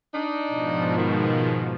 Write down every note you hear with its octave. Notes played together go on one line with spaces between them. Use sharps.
D4 D#4
G#2 B2 F3
D#3